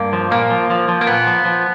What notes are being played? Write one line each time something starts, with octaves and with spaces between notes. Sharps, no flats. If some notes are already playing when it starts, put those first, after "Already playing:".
Already playing: G2 A#3
F3
A#2 A#3
F3
F3
F3
A#3
A#2 B3
F3
F3